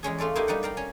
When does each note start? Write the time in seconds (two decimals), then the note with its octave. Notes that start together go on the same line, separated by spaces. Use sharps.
0.03 E2 G#3 C#4 G#4
0.18 A3 F4 A4 D5
0.36 A#3 B3 D#4 E4 F#4 G4
0.47 G3 D#4 D5 F#5 G5
0.63 D5 F5 G5 A#5
0.77 C#4 C#5